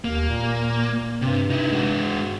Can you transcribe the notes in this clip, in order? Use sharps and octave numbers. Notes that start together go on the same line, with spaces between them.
D#2 A#3
A#2
G2 C3
D#4 E4
G#3 F#4